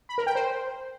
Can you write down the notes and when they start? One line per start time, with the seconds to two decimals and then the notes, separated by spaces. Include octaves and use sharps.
0.09 B5
0.18 A#4
0.27 G5
0.35 C5